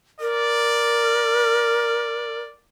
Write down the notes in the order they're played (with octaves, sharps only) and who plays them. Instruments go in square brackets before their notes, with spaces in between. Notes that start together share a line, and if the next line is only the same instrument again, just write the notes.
[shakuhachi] A#4 [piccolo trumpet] D5